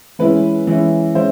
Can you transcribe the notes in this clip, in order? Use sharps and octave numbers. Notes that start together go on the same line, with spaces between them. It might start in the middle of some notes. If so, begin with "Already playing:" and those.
E3 G#3 C#4 E4 B4
E3 G#3 C#4 E4
E3 G#3 C#4 E4 C5